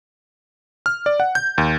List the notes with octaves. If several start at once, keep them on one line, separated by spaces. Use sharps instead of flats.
F6
D5
F#5
G6
D#2